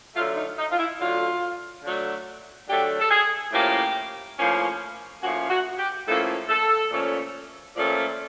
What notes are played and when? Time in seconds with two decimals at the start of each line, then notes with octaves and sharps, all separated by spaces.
0.15 D3 F#3 A3 F4
0.37 D#4
0.58 D#4
0.71 F4
0.78 E4
1.00 D3 F#3 A3 F4
1.84 D3 F#3 A3
2.69 D3 F#3 A3 G4
3.00 A4
3.10 G#4
3.53 A2 F3 A#3 C#4 G4
4.38 A2 F3 A#3 C#4
5.22 A2 F3 A#3 C#4 F#4
5.50 F#4
5.78 G4
6.07 A2 F3 A#3 C#4 A4
6.49 A4
6.91 A#2 F3 A3 C#4
7.75 A#2 F3 A3 C#4 D5